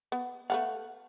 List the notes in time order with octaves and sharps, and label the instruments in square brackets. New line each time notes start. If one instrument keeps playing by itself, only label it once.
[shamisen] B3
[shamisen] A3 B3 F5 [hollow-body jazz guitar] F#5